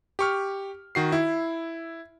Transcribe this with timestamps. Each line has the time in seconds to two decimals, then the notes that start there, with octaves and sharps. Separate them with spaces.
0.19 G4 C#6 F6
0.95 D#3 F#4 C7
1.12 E4